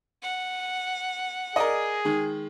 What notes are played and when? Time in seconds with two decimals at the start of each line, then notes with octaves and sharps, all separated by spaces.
0.22 F#5
1.56 G#4 A#4 D5 D#5
2.05 D#3 G#3